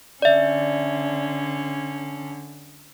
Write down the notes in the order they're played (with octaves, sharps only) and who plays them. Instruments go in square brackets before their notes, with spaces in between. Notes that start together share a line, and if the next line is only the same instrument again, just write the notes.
[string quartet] D3 C#4 [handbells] D5 E5